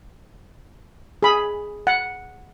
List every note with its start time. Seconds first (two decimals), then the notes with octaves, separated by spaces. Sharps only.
1.23 G#4 B5
1.87 F#5